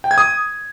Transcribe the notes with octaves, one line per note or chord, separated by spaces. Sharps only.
G5
G#6
D#6